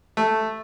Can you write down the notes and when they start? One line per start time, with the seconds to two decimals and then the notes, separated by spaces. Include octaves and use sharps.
0.17 A3